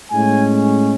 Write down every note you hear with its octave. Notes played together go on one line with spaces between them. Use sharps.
A2 G#3 C#4 G#5